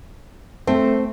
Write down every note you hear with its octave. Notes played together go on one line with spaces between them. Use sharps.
A3 C4